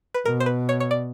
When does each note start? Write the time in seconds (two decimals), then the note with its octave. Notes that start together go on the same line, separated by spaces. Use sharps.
0.14 B4
0.25 B2 A#4
0.40 C5
0.46 B4
0.69 C#5
0.80 C#5
0.91 D5